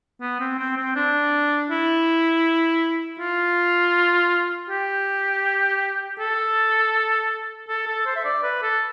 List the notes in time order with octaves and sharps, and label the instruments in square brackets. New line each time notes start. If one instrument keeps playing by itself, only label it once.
[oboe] B3
C4
C4
C4
D4
E4
F4
G4
A4
A4
A4
C5
E5
D5
B4
A4